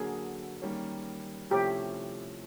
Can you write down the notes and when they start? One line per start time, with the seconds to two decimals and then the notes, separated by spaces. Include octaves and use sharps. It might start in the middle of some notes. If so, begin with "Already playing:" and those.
Already playing: D3 F#3 A#3 G#4
0.62 D#3 G3 A#3 C#4
1.50 C3 F3 A3 C#4 E4 G4